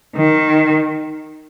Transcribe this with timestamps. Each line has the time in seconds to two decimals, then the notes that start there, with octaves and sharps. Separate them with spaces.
0.16 D#3